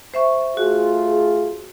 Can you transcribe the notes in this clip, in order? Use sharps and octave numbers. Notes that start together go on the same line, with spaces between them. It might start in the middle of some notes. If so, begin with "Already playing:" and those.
C5 E5 C#6
A3 F4 F#4 G#4